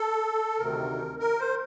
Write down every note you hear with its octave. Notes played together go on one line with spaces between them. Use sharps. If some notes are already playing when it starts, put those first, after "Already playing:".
Already playing: A4
D2 C3 D#3 A#4
A#4
C5